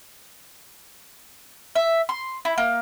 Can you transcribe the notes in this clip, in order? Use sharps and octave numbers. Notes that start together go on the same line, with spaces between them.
E5
C6
E4
A#3